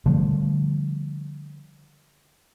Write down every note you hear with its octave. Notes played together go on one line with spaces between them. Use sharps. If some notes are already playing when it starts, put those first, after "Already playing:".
D3 F3 G3 A3